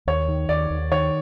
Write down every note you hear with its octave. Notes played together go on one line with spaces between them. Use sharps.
D#2 C#5
D#3
D#2 D5
D#2
D#3 C#5